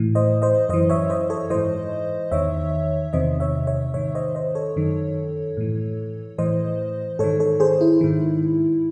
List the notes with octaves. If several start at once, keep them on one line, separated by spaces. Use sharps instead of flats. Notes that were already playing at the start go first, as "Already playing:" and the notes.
Already playing: A2 E3
C5 D#5
C5 D#5
F#2 E3 C5 D#5
C#5 E5
C5 D#5
A4 C#5
G#2 E3 C5 D#5
E2 D#3 C#5 E5
E2 C3 D#3 C5 D#5
C#5 E5
C#5 E5
G#2 D#3 C#5 E5
C5 D#5
C5 D#5
A4 C#5
F#2 D#3
A2 E3
A2 E3 C5 D#5
G#2 D#3 A4 C#5
A4 C#5
G#4 C5
E4
G#2 D#3